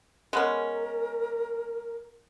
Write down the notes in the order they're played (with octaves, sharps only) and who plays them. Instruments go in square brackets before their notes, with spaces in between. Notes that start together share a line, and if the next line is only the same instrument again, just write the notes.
[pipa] G#3 B3 C#4 [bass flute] A#4